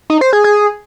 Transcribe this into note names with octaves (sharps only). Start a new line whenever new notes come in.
D#4
C5
G#4
G#4